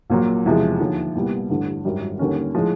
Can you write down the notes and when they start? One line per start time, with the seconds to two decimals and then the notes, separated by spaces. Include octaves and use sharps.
0.10 A#1 A#2 F#3
0.45 E1 E2 C3 F3 G#3
0.80 D#2 D3 F3
1.15 C2 A#2 G3 B3
1.50 A1 G2 D3
1.85 G#1 F#2 D#3 G3
2.19 D#2 D3 G3 A#3 C#4
2.54 A2 F3 G#3